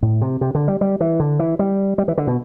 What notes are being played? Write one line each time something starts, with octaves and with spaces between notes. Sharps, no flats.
A2
C3
C3
D3
G3
G3
E3
D3
E3
G3
G3
E3
D3
B2